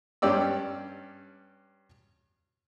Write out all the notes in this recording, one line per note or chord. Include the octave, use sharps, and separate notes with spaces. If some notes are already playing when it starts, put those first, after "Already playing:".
G2 C#4 G4 D5 E6